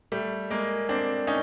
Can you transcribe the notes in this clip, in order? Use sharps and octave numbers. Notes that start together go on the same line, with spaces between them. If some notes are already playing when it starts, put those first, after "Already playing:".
G3 A3
G#3 A#3
C4 D4
C#4 D#4